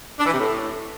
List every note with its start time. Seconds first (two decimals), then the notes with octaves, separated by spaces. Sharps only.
0.19 D4
0.26 E3
0.33 C3
0.39 A2